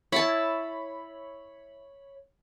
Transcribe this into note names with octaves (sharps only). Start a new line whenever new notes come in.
E4 C#5 A5 B5